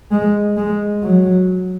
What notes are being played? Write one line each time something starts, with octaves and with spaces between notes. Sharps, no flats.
G#3
G#3
F#3